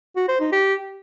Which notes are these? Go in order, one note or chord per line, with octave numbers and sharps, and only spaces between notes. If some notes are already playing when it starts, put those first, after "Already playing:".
F#4
C5
D#4
G4